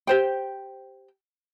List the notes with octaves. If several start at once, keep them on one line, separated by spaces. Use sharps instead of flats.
G4 C5 G5